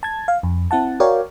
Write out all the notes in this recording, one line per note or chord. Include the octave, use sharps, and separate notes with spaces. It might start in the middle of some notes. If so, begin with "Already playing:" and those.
A5 G#6
F5
F2
C4 E4 F#5 A5
F#4 A#4 C#5 D5 F5 G5